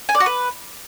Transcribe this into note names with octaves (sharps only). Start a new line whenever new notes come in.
G#5
D5
F#4
B4